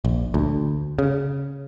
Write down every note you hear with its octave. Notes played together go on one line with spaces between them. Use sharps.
A#1
D2
C#3